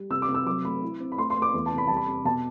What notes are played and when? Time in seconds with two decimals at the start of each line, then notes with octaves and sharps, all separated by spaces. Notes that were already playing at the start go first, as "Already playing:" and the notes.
Already playing: G3
0.10 C3 E6
0.22 D6
0.29 C3
0.34 E6
0.46 F#3 D6
0.65 A3 B5
0.82 E4
1.00 C4
1.12 B5
1.17 A3 C6
1.30 C6
1.36 A3
1.42 D6
1.54 E2
1.66 A5
1.71 C3
1.78 B5
1.87 G3 A5
1.97 B5
2.08 C3
2.25 B2 A5